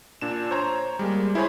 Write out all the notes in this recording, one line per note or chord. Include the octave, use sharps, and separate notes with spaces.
A#2 D4 E7
C5 C#5 A#5
G3 G#3 A#3
E4 G#4 C5 C#5 B5